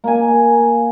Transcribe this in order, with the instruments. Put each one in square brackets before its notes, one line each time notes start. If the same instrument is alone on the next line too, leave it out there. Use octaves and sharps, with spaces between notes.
[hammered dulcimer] A#3 G#5